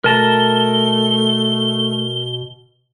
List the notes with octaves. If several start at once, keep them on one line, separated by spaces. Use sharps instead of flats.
B2 A3 A#4 A5 A#5 G7